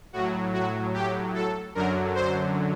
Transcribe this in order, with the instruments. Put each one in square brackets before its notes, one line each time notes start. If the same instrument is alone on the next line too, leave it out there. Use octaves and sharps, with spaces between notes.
[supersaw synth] A2 F#3 F#4
F#4
G4
A4
F#2 D3 F#3 A#4
C5